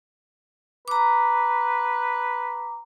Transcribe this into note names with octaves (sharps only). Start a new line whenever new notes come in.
B4 A#5 D6